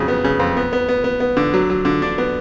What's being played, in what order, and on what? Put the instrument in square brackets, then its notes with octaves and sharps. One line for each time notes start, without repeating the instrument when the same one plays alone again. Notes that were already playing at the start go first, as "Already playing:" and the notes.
Already playing: [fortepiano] F2 C#3 F#3
B3
C#3
F2
B3
B3
B3
B3
B3
D3
F#3
F#3
D3
D4
B3